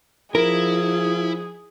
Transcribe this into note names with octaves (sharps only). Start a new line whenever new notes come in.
F3 E4 G#4 A#4